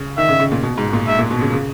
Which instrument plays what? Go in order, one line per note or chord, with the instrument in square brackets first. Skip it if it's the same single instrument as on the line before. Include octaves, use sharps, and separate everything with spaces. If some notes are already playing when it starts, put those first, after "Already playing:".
Already playing: [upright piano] C#3
[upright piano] D#3 [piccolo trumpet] E5
[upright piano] C#3
C#3
A#2
B2
G#2
A#2
[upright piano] G#2 [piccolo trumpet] E5
[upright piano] A#2
B2
C#3
C#3